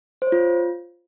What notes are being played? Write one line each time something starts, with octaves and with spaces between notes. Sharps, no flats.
C5
C#5
F4